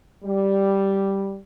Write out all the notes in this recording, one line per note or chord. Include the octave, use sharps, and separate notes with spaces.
G3